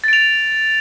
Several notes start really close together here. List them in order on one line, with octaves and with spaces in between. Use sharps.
A6 D7 F7